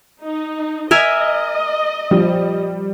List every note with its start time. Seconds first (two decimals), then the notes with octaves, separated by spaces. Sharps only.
0.23 D#4
0.91 A#4 D#5 E5 G#5
2.11 F3 G3